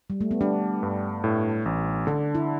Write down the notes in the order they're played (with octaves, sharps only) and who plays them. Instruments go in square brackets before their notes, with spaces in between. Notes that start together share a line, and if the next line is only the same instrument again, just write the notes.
[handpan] G3
A3
B3
[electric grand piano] G3 [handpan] D4
[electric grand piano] G2
A2
A1
[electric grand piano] D3 [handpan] D4
[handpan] E4